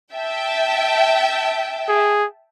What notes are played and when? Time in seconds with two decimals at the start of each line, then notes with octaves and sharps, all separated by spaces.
0.14 E5 G5 A5
1.88 G#4